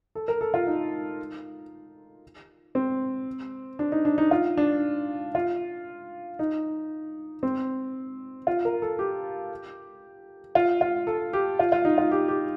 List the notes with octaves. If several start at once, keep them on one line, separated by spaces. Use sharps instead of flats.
A4
A#4
A4
F4
D#4
C4
D4
D#4
D4
D#4
F4
D4
F4
D#4
C4
F4
A#4
A4
G4
F4
F4
A4
G4
F4
F4
D#4
F4
G4
G4